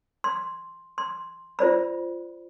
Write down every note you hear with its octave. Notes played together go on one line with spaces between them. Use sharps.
C6
C6
F4 C5 D5 B5